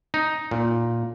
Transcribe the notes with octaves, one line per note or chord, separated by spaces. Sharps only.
D#4
A#2